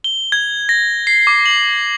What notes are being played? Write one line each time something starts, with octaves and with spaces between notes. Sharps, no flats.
G7
G#6
A#6
C7
D6
F#7